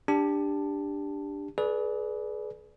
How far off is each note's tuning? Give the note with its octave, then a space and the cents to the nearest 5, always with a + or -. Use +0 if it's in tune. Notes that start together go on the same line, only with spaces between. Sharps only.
D4 +0 G4 +15 A5 +0
G#4 +35 B4 -15 D5 +0